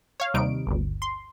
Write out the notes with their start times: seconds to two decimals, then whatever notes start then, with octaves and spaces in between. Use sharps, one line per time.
0.20 C#5 F5
0.34 D#2 C3 G3 D#4 D7
0.67 G1 D2
1.02 C6